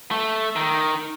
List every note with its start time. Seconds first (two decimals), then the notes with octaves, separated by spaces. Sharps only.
0.11 A3
0.56 D#3